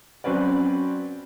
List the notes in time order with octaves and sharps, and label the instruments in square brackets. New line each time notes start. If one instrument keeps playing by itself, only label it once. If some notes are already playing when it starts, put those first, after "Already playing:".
[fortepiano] F#3 C4 C#4 B4 D5